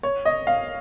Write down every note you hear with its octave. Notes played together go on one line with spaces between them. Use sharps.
C#5
D#5
F5